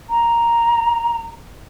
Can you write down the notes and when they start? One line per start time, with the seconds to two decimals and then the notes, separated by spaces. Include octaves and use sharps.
0.10 A#5